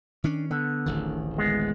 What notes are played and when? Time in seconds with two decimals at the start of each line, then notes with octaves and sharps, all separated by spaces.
0.24 D#3 C#4 D4
0.51 D3 B3
0.86 D1 A1 D#3
1.38 G#3 B3